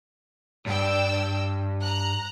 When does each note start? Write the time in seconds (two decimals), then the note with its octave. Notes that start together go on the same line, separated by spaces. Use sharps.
0.66 G2 D5 G5 E6
1.82 A#5 F#6